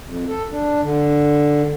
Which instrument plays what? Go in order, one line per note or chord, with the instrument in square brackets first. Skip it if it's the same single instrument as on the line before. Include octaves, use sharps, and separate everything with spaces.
[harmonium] F2
A4
D4
D3